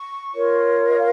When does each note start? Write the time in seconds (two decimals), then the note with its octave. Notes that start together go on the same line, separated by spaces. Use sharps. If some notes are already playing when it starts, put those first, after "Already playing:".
Already playing: C#6
0.32 F4 A#4 C#5
0.87 D#5
0.97 F5